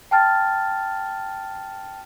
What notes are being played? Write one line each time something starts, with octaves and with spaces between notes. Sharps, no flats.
G5 A5 F6 A6